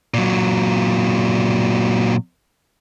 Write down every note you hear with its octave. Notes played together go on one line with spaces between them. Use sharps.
A#2 F#3